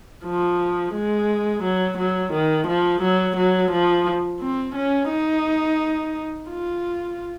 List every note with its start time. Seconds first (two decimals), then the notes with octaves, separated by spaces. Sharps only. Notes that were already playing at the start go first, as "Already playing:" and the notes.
0.25 F3
0.94 G#3
1.63 F#3
1.98 F#3
2.33 D#3
2.67 F3
3.02 F#3
3.36 F#3
3.71 F3
4.40 C4
4.75 C#4
5.10 D#4
6.49 F4